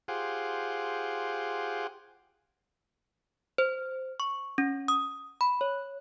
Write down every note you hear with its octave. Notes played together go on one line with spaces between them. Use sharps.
F4 G4 G#4 C5 F#5
C5
C#6
C#4
D#6
B5
C#5